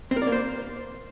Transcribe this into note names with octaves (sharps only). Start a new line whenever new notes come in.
C4
A#4
D5
A#3
C5